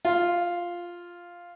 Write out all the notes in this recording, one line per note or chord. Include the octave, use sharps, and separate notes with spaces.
F4